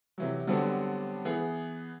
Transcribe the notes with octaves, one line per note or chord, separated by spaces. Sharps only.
C3 E3 F#3
D3 F#3 G3 B3 C4 D4
E3 B3 G#4